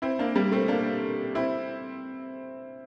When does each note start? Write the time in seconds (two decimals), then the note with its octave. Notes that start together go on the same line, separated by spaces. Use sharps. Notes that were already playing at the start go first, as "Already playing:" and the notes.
0.02 C4 E4
0.19 A#3 D4
0.35 G3 A#3
0.52 A3 C4
0.68 A#3 D4
1.35 C4 E4